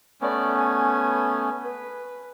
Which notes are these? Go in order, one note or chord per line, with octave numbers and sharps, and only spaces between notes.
A3 B3 C#4 D5
G#5
B4